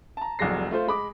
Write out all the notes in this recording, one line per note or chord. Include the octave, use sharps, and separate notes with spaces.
A5 A#5
F1 C2 F#3 G#3 A#6 C7
A3 F4 C5
G#3 B5 D6